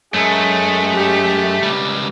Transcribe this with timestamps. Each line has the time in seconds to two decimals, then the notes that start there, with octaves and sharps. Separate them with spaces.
0.14 F#2 G#3 A3
0.94 G4
1.63 C#2 G3